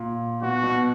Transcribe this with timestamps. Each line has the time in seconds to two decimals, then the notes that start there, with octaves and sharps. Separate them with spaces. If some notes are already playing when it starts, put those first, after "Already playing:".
Already playing: A#2
0.42 B2 F#4
0.63 B2